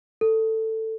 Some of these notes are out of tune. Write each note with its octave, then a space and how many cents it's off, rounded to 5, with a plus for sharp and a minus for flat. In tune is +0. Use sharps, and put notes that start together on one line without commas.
A4 +15